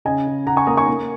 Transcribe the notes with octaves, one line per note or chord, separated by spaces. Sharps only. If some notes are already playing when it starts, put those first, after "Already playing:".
C#3 D#5 G#5
C#3
C#3 F#5 A#5
G#5 C#6
A#3 A#5 D#6
G#5 C#6
A#3